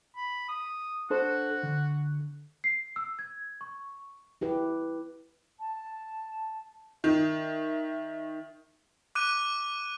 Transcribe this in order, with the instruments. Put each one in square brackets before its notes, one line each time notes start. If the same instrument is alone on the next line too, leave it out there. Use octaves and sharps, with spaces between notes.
[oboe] B5
D#6
[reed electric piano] D4 A4 C5 [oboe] F#4
[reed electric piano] D3
[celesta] C7
E6
G#6
C#6
[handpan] E4 G4 B4
[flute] A5
[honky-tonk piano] D#3 [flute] E5
[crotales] D6 F#6 D#7